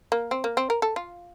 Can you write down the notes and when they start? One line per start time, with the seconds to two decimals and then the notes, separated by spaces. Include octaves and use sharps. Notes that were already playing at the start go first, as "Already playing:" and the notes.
0.12 A#3
0.31 C4
0.44 A#3
0.57 C4
0.70 A#4
0.82 A4
0.96 F4